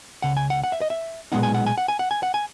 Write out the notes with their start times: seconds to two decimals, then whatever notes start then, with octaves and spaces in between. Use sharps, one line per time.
0.22 C#2 C#3 F#5
0.37 G#5
0.50 F#5
0.64 F#5
0.72 E5
0.81 D#5
0.90 E5
1.32 B1 A#2 G#3 B3 D#4 F#5
1.43 G#5
1.54 F#5
1.66 G#5
1.78 F#5
1.88 G#5
1.99 F#5
2.11 G#5
2.23 F#5
2.34 G#5